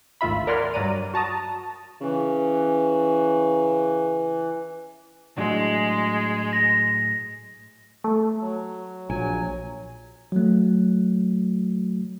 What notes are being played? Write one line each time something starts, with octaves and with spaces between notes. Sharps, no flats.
G#1 D2 F4 E5 B5
A#4 D5 F#5 G#5 C6 F6
G2 F#3 D5 A#5 D#7
F#4 A5 A#5 D#6
C#3 E3
A2 F#3 G#3 D4
A#6
A3
F#3
A#1 F#3 G#5
F#3 A3